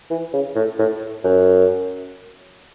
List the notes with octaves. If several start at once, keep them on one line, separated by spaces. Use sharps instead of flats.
E3
C#3
A2
A2
F#2